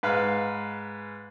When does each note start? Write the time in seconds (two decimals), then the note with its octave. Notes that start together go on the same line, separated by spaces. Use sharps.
0.03 G#2 B4 F5 B5